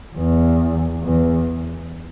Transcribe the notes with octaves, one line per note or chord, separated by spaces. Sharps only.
E2
E2